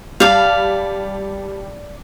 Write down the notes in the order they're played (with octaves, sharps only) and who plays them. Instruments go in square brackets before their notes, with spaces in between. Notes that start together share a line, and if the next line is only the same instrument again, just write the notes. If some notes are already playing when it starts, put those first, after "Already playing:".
[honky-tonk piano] G3 A5 [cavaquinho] D5 F5